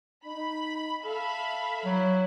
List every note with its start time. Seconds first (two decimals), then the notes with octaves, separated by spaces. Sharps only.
0.25 D#4 B5
1.05 A4 E5 F5 B5
1.85 F#3 E4